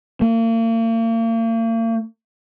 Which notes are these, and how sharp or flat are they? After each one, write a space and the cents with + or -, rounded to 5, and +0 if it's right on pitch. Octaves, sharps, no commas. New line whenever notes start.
A#3 -40